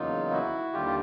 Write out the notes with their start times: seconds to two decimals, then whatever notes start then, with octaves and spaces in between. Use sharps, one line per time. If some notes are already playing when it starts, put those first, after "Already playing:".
Already playing: E2 C#3 F#3 A#3 D#4 F4
0.30 E4 F#4
0.73 D#2 D3 G3 F4 G4
0.86 F4